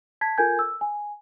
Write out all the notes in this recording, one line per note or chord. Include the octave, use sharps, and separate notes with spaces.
A5 G#6 B6
F4 A4 A#4 G#5 G6 G#6
E6
G#5